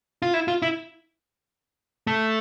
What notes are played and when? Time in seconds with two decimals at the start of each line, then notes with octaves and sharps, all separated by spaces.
0.22 F4
0.34 E4
0.48 F4
0.62 E4
2.07 A3